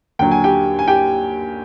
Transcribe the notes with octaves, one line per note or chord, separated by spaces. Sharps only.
D#2 D3 F#3 G5
G#5
G4 G5
G#5
G4 G5